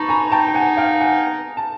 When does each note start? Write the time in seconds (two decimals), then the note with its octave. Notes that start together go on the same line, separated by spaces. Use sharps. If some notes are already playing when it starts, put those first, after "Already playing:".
Already playing: D#4 A5 B5 C#6
0.09 G#5 A#5
0.32 G5 A5
0.48 G5
0.54 F#5 G#5
0.77 F5 G5
1.00 F#5 G#5
1.57 A5